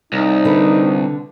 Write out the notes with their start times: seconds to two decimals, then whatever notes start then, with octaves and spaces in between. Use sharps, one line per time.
0.13 C2 D#4
0.45 D3 B4